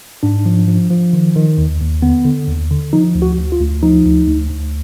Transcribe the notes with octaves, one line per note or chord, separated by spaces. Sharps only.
G#2 D4
F3
F3
F3
D#3
D#3
D#2
D#2
D3 B3
D3
D#2
D3
F3 D#4
D2
F#4
D2
F4
D2
F3 D#4
D2
D2
D2